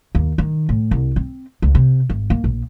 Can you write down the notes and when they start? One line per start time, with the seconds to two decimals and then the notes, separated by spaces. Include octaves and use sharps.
0.15 D#2
0.38 D#3
0.69 A2
0.91 C2
1.16 C4
1.62 C#2
1.75 C3
2.10 G#1
2.30 A#3
2.44 A#1